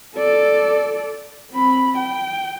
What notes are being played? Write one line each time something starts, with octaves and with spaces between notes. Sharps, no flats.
A4 D5
C4 B5
G5